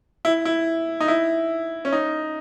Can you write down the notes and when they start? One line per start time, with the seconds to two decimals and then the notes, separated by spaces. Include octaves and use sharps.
0.25 E4
0.45 E4
1.01 D#4
1.08 E4
1.85 C#4
1.92 D#4